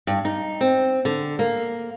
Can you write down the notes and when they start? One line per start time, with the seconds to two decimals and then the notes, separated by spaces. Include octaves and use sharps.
0.07 G2
0.25 D#4
0.61 C4
1.05 D3
1.39 A#3